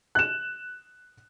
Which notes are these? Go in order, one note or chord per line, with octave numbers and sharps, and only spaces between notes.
F#6 E7